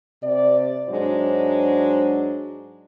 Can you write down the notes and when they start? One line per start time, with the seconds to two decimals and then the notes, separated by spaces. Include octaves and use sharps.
0.23 C3 D5
0.89 G#2 F#3 G#3 D4 C5